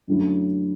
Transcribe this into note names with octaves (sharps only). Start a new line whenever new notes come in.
F#2 D3 F#3 A3 E4